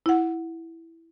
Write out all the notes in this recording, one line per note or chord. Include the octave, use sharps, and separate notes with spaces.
E4 F#5